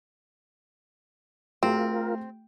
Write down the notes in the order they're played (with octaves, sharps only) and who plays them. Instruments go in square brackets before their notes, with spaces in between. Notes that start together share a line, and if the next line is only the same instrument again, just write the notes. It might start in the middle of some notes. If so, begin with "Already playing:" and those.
[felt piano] A3 F#4 G#4 [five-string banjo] C4 [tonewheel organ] F4 A#4